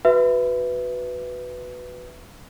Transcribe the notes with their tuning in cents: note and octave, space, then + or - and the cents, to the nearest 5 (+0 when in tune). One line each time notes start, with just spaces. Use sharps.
F#4 +0 B4 +5 E5 +5